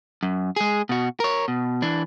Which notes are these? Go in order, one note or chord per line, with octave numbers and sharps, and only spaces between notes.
F#2
G#3 G#4
B2 F#4
A#4 C#5
B2
E3 D4